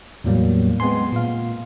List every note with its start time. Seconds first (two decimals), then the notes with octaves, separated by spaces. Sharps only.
0.24 E2 A2 F#3 G3 A#3
0.80 G#3 B3 C4 G#5 C6
1.12 A#2 F5